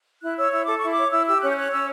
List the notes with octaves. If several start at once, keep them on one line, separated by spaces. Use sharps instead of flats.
E4 F#6
C#5 E6
E4 E6
A4 D6
E4 C#6
D6
C#5
E4 E6
G4 E6
C#4 F#6
G6
C#5 F#6
C#4 E6